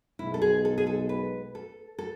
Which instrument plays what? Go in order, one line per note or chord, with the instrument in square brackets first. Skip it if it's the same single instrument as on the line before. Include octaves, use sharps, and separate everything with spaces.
[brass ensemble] B1 B2 G#3 [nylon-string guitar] E4
[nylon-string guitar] A4
G#4
A4
G#4
A4
B4
A4
A4